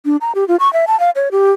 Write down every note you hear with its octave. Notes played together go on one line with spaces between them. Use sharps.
D4
A#5
G4
F4
C#6
E5
A5
F5
C#5
G4